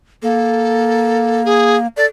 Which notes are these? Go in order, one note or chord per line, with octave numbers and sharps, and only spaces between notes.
A#3 A4
G#4
A4 D5